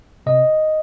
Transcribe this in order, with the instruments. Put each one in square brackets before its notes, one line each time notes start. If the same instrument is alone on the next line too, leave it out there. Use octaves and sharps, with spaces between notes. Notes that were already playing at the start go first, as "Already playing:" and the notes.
[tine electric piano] C3 D#5